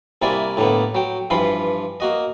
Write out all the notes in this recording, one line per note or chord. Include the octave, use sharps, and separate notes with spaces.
C2 C3 A#3 E4 D5 G#5
A2 D3 A#3 B3
F#3 G5
G2 E3 F3 B5 C6
A#3 F#4 D#5